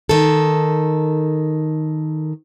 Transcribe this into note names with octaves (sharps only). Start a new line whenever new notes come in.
D#3 A4